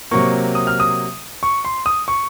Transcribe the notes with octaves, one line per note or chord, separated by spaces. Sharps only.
C3 F#3 A#3 C#6
D#6
F6
D#6
C#6
C6
D#6
C#6